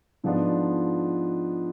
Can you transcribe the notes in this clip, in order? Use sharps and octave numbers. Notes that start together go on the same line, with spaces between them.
G#2 F3 B3 D4 F4